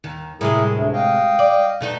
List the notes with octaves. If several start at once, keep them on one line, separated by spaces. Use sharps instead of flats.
D#2 D#3
A2 C3 G#3 E4 G#4 A#4
D2
D#5 F5 G5
D5
B2 A3 D#4